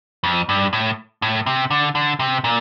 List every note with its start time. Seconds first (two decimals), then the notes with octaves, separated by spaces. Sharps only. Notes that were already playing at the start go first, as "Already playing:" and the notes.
0.24 F2
0.49 G2
0.73 A2
1.22 A2
1.46 C3
1.71 D3
1.95 D3
2.19 C3
2.44 A#2